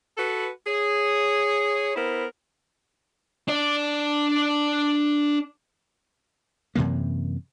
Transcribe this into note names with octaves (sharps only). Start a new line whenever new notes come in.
F#4 A4 B4
G#4 C#5
B3 E4 A#4 C5
D4 D5
F#2 C3 E3 A#3